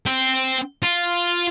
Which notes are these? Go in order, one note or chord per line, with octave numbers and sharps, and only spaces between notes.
C4
F4